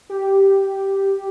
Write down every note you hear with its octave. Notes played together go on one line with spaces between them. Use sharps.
G4